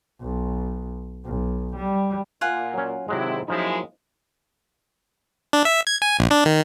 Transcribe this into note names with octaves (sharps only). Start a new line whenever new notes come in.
B1
B1
G3
A#2 F4 F#5 G#5
F#3 C#4
G#1 C3 F#3 G#3 C4 E4
F3 F#3 G#3 A#3 C#4 D#4 E4
D4
E5
G#6
G#5
A#1
D4
D#3